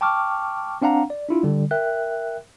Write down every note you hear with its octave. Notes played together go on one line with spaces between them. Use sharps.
G5 A5 C#6 D6 F6
C4 D4 F5 F#5 A#5
D5
D4 E4 F4
D3 G3
A#4 E5 G5 F#6